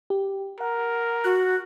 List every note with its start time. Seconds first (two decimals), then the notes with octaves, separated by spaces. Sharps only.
0.10 G4
0.60 A#4 F#5
1.24 F#4 F#6